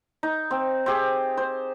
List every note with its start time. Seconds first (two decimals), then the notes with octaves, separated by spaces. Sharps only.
0.23 D#4
0.51 C4
0.86 C4 G4 G#4
1.37 C5